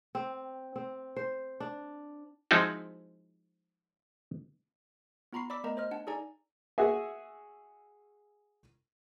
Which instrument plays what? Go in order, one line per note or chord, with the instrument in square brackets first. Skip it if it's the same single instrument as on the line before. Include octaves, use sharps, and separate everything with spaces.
[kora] C4
C4
C5
D4
[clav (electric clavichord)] F3 G#3 C4 D#4 E4 F#4
[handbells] B3 F4 A#5 B5 C#6 C7
D5 B5 D6 E6 B6
A3 B3 A#4 D#5 A#5
C5 D#5 F6
D4 F#5 A5
D#4 G#4 A4 D5 G#5 A#5
[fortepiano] F#4 G#4 E5 G#5